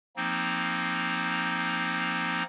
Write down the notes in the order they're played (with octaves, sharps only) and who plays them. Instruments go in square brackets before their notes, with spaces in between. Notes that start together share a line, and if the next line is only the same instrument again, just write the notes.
[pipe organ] F3 A#3 C4 D#4